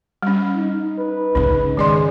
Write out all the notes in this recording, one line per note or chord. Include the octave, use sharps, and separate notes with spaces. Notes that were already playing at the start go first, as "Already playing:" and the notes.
G3 C#4
D#4
B4
G#2 C#3 C#4
D#3 G#3 D5 C6